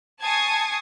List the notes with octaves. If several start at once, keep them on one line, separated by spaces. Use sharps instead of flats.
G#5 A5 C#6 D#6 G#6 C7